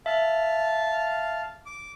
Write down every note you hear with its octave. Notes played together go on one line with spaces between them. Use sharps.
E5 F5 A5
D6